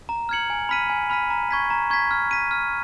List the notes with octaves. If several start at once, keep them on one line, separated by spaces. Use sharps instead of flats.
A#5
F6 G#6 C#7 F#7
G#5
B5 F6 B6 D#7
G#5
B5 F6 B6 D#7
A#5
C#6 G#6 B6
A#5
C#6 G#6 B6
F6
B6 D#7
F6